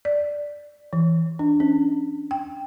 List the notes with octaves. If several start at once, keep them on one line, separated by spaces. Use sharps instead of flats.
D5
E3
D4
C#4
G5